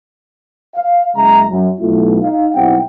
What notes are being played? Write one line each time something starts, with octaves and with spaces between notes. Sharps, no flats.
F5
F#1 C#3 G#3 E5 A#5
F#2
B1 A3 E4 F4
D#4 F5
B1 G3 C4 E4 F#5 G5